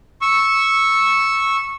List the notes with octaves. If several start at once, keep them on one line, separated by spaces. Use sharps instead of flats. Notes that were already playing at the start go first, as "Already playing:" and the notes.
C#6 E6